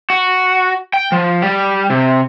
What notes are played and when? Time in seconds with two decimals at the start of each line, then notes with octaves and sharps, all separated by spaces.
0.10 F#4
0.93 G5
1.12 F3
1.42 G3
1.90 C3